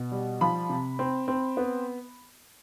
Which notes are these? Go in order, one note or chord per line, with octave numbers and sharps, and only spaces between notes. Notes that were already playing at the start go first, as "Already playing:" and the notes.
Already playing: B2
G3
F3 B5
C3
C4
C4
B3